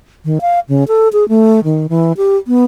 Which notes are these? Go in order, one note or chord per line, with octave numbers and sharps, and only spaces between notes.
D#3
F5
C#3
A4
G#4
A3
D#3
E3
G4
B3